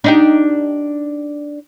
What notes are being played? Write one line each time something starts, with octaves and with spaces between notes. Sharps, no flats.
D4 D#4 G4